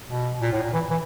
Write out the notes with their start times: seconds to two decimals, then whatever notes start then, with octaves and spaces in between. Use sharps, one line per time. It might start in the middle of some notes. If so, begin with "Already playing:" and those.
0.09 B2
0.42 A#2
0.52 A2
0.63 A#2
0.73 E3
0.90 E3